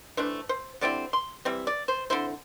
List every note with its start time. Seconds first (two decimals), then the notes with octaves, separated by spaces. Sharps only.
0.17 E3 A3 D4 C5
0.49 C5
0.81 D3 G3 C4 E4 D5
1.13 C6
1.45 E3 G3 C4 E4
1.67 D5
1.88 C5
2.10 D3 C4 E4 C5